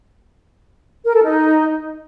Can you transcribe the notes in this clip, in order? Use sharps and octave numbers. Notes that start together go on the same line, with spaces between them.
A#4
A4
D#4